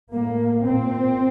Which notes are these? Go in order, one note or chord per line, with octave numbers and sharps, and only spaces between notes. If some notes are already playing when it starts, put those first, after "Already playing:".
A2 A#3
A#2 C4